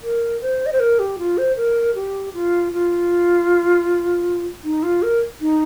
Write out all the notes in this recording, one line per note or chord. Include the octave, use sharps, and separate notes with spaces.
A#4
C5
D#5
C5
A#4
G4
F4
C5
A#4
G4
F4
F4
D#4
F4
A#4
D#4